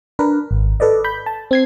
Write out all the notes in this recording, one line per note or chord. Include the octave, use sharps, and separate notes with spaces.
D4 A#4 B4
G#1
A4 B4 D5 D#5
B5 G6
A5
C4 G#6 C7